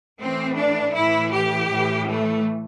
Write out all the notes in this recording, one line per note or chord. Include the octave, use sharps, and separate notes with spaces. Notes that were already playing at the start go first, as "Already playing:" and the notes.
A2 E3 C4
D4
A2 E3 E4
G4
A2 E3
A3